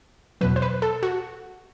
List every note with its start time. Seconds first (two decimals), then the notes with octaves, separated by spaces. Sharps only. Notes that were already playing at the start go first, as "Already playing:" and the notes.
0.41 E2 B2 F#3 B4
0.56 C5
0.62 B4
0.82 A4
1.03 F#4